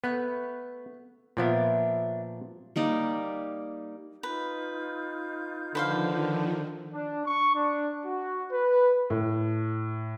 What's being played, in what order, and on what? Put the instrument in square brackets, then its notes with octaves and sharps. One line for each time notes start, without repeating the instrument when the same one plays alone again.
[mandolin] A3 B5 F#6 [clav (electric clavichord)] B3
[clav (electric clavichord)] A#2 F3 B3 [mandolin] D4 E4 C#5
[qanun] G3 A#3 D#4 D5
[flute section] D#4 F4 G6 [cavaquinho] B4
[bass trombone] D3 [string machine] D#3 F3 [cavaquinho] B4 C5 F5
[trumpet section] D4
C#6
D4
F#4
B4
[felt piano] A2